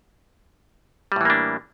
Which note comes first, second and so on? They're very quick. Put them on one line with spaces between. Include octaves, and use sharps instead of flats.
G3 A2 E3 A#3 D4